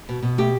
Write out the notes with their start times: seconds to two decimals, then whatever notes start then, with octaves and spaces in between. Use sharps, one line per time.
0.09 B2
0.23 B2
0.38 A3 G4